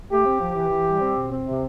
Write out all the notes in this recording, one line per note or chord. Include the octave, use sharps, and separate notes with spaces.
A3 G4
C4
F3
E3
E3
G3
C4
B2
C4
C3